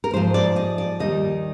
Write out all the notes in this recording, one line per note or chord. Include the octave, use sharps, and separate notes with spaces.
A#4
G#2 F3 C5
D5
D#5
D5
D#2 D#3 G3 D#5